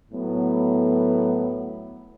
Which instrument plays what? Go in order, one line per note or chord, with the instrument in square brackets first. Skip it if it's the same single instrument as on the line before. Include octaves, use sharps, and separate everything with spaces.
[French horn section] A2 F#3 B3